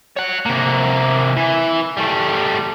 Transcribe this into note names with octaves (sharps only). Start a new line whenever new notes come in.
C#5 F#5
C3 A#3
E3
G3 A3